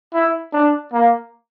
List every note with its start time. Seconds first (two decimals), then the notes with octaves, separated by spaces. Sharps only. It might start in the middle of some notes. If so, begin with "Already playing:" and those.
0.14 E4
0.53 D4
0.93 A#3